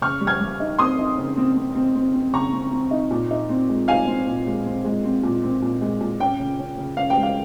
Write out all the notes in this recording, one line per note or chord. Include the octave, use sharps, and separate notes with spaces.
C#3 C#6 F6
G3
F6 G#6
G3
D#4
C4 C6 D#6
D#4
C#3
C4
C4
C4
C4
C4
C#3 A#5 C#6
C4
C4
D#4
A#2
D#4
C4
G#3
D#4 F5 G#5
C4
A#2
G#3
C4
G#3
C4
A#2
C4
A#2
G#3
A#2
C#4 G5
C#3
C#4
C#3
C#4 F5
G5
G#3
F5